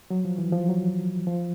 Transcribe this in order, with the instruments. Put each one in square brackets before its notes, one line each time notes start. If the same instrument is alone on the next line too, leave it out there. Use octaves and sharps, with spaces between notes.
[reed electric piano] F#3
F3
E3
F3
F#3
F3